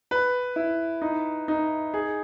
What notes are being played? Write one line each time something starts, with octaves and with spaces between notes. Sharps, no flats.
B4
E4
D#4
D#4
G#4